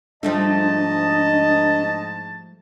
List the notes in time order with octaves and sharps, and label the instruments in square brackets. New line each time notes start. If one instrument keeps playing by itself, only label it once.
[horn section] G#2 A5 [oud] F3 G3 A3 [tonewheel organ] D4 [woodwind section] D#5